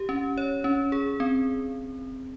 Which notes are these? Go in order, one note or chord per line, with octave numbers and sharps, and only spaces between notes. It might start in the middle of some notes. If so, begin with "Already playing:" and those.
Already playing: G4
C#4
C#5
C#4
G#4
C4